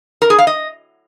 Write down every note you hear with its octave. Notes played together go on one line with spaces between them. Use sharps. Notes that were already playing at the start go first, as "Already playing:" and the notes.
A#4
G#4
F5
D#5